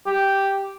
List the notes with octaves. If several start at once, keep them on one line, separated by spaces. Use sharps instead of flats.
G4